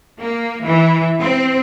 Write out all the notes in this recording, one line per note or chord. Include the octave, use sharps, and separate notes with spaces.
A#3
E3
C4